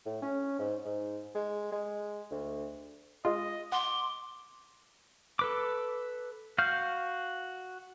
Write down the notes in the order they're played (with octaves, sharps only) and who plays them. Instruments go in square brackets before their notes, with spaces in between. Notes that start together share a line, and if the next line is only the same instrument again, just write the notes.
[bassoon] A2
C#4
G#2
G#2
G#3
G#3
D2
[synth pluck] G#3 F4 [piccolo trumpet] D#5
[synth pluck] F#5 [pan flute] C6 [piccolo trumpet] D6
[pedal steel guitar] A4 B4 D6
F#4 F5 F6 G6